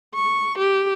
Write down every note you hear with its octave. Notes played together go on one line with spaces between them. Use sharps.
C#6
G4